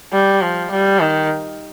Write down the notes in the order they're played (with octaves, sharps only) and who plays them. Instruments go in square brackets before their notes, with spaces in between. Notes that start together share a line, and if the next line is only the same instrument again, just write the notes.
[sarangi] G3
F3
G3
D#3